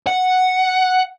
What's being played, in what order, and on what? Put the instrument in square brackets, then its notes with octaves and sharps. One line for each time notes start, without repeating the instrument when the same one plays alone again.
[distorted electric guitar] F#5